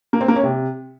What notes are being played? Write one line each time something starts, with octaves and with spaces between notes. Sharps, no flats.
A#3
C4
A#3
C#4
C3